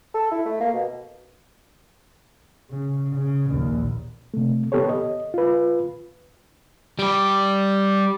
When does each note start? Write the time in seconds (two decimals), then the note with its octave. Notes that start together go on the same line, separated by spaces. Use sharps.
0.14 A4
0.31 E4
0.46 A3
0.60 A#3
0.73 B2
2.71 C#3
3.15 C#3
3.50 A#1 D#2
4.34 C3 A3
4.72 B3 G4 A4 B4 C#5
4.89 D#5
5.34 F4 B4
6.99 G3 G4